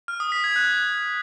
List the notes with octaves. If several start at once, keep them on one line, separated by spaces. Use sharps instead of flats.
F6
D#6
B6
G#6
F#6